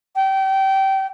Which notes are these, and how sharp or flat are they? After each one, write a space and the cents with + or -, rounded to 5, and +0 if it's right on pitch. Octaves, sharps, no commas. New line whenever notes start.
G5 -25